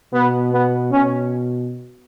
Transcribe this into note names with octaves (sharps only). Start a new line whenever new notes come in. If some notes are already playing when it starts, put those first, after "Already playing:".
B2 B3
B3
B2 C#4